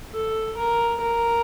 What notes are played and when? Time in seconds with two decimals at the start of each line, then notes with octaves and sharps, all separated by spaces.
0.12 A4
0.57 A#4
1.02 A#4